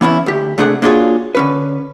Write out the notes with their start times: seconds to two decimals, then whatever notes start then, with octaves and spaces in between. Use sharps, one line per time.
0.01 E3 B3 C#4 E4
0.26 D2 G4
0.58 C3 A3 D4 G#4 F#5
0.82 A#3 D4 F4 F#4 G#4 C#5
1.35 D3 C#4 B4